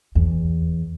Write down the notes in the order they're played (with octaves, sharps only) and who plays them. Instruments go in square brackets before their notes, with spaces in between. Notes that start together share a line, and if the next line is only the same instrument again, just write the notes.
[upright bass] E2